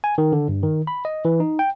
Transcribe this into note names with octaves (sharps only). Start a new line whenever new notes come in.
G#5
D#3
D3
G2
D#3
B5
D#5
E3
D#4
G5